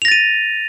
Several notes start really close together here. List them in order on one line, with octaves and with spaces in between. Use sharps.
F7 A#6 A6 D#7